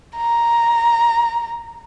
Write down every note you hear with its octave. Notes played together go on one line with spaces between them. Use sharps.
A#5